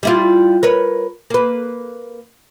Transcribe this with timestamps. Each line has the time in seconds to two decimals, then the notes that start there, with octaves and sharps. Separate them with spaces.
0.03 G3 E4 F4
0.63 A#4 B4 C#5
1.30 A#3 B4